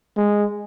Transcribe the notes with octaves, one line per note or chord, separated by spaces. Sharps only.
G#3